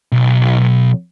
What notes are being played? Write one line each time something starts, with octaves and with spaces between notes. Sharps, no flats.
B1